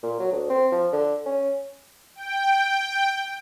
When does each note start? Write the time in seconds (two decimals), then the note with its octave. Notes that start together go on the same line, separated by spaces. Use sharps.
0.03 A#2
0.20 F#3
0.32 D2
0.50 C4
0.72 F3
0.92 D3
1.26 C#4
2.15 G5